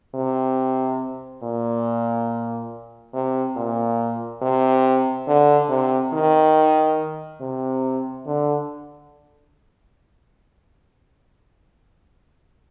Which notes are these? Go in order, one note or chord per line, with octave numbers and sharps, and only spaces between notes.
C3
A#2
C3
A#2
C3
D3
C3
D#3
C3
D3